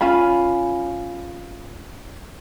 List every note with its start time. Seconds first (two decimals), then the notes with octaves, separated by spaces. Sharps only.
0.01 C#4 F4 G#5 B5